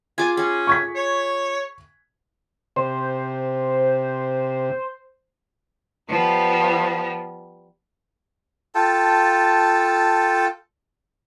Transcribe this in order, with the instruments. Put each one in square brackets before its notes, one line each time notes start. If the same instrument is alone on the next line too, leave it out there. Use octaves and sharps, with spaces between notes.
[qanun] F4 G#4 D6 [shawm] G#5
[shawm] C#4 [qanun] G#4
[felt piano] C#6 G#6 B6
[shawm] C#5
[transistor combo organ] C3 [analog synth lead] C5
[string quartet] F3 G3 B3
[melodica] F4 A4 G5 A5